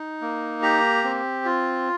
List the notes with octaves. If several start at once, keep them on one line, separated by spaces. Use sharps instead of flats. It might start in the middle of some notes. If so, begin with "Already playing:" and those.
Already playing: D#4
A#3
G4 A#5
C4
F4